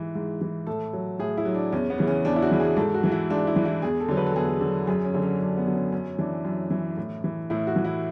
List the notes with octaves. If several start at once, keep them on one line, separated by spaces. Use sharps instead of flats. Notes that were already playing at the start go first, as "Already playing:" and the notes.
Already playing: G#2 E3
G#2
E3
A2 A4
F#3
A2 G#4
E4
F#3
D4
E2 C#4
B3
C#3 E3
C#4
E2 D4
E4
F#4
C#3 E3
G#4
G#2 A4
F#4
E3
E4
G#2 D4
E4
E3
E4
E2 G#4
A4
D3 F#3
B4
A4
E2 G#4
A4
D3 F#3
F#2 G#4
C#4
D3 F#3
C#4
F#2 D4
B3
D3 F#3
C#4
F#2 C#4
E3 D4
F#2
E3
A2
E3
A2 E4
F#4
E3
E4